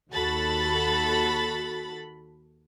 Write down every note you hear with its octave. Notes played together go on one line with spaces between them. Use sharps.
D#2 F#4 A4 B5 A6